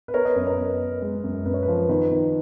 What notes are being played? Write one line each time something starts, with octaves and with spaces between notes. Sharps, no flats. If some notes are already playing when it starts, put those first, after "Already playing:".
B4
B3 A#4 C#5
B4 D#5
F#2 B4 D#5
A#4 C#5
B3 B4
B3
G#3
F#2
F#2 B4
C#5
B4
F3
D#3 B4
D#3